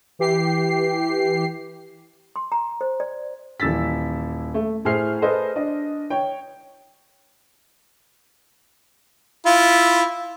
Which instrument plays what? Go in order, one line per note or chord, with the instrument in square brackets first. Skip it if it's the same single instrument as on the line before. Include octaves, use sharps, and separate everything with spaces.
[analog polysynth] E3 G4 C7
[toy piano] C6
A#5
C5
D5
[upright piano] D#1 E3 E6 A6 B6
A3
A2 E4 G#4 C5 F6 C7
G#4 A4 B4 C5 D#5
D4 D#5
C#5 G5
[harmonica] E4 F4